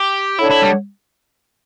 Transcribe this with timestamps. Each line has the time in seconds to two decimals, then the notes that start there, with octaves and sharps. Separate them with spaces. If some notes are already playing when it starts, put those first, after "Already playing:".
Already playing: G4
0.39 D4 E4 A4 C#5 F#5
0.50 E4
0.62 G3